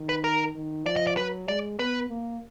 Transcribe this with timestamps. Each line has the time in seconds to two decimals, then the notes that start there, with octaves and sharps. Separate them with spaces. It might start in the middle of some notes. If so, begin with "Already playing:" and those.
Already playing: D#3
0.09 B4
0.24 A#4
0.55 D#3
0.86 F3 D5
0.96 D#5
1.07 D5
1.17 F#3 B4
1.48 G#3 D5
1.79 B3 B4
2.10 A#3